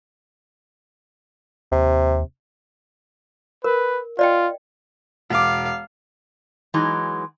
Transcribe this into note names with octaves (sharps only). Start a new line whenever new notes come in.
D#2 C3
A#4 B4
F4 D5 D#5 G5
E1 F5 D6
E3 F#3 G#3 D#4